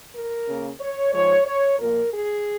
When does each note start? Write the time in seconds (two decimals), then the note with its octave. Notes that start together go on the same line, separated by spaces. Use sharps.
0.14 A#4
0.46 C#3 A#3
0.80 C#5
1.12 G#2 F3 G#3 C#5
1.45 C#5
1.79 A#2 F3 A#3 A#4
2.12 G#4